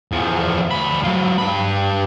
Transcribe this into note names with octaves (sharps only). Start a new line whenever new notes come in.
E2 F3
D2 B5
F#3 F4
G2 B5